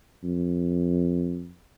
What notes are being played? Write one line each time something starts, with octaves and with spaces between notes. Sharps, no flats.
F2